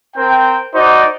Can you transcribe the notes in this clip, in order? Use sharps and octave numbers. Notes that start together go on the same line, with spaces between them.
C4 A#4 G5
D#4 F#4 C5 D5